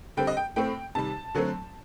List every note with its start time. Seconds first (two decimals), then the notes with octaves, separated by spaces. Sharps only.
0.17 D3 G3 C4 G5
0.27 D#5
0.37 G5
0.56 A2 A3 C4 G5
0.95 C3 D#3 G3 A5
1.34 D3 F#3 A3 C4